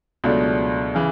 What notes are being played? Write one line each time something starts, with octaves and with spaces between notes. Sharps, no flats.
C#2 B2 F#3 A3 D4
C#3 E3